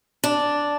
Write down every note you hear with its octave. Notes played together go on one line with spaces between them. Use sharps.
D4